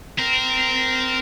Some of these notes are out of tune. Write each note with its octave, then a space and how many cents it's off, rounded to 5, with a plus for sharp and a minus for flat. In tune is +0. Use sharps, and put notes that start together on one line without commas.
C4 -20 A#4 +0